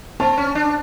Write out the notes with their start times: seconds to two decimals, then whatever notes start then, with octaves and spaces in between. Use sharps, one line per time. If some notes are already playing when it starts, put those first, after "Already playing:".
0.20 C4 A5
0.37 C#4
0.55 D4